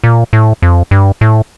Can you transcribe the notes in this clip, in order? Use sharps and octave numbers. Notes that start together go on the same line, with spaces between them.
A#2
A2
F2
G2
A2